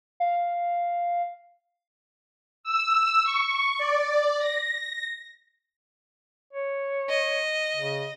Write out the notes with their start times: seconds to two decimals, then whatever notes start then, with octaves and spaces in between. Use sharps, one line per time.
0.20 F5
2.64 E6
3.24 C#6
3.78 D5
4.39 A#6
6.53 C#5
7.09 D#5
7.76 C#3